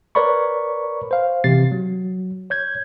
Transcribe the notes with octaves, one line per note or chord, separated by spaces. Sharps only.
A#4 B4 C#5 D5 B5 C#6
C5 F5
C3 E3 A6 C7
F#3
C#5 G6 G#6